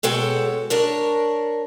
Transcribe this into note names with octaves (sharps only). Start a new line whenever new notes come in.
B2 G#3 A4 C#5 G5
D4 A#4 C#5